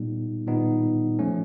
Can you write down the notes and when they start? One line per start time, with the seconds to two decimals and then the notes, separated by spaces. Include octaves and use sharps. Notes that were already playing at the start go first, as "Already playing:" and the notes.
Already playing: A#2 G3 B3 D#4
0.47 A#2 G3 B3 D#4
1.19 F3 A3 C#4